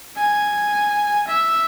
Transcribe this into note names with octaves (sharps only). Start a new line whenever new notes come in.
G#5
E5